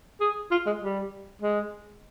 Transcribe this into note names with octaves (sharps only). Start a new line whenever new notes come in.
G#4
F4
G#3
G3
G#3